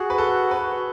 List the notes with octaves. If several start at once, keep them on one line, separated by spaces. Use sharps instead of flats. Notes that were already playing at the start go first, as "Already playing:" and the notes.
Already playing: F#4 G#4
B4
A4
B4